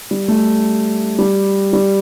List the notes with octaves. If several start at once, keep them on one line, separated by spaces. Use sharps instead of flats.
G3
A3
G3
G3